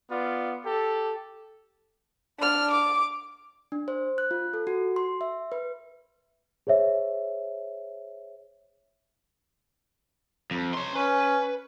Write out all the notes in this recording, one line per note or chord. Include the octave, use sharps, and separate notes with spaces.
B3 F4 D5
G4 A4
D4 F6
D6
D4
C5
F#6
F4
A4
F#4
C6
E5
B4
G#4 C5 C#5 E5
F2
C#5 C6
C#4 B4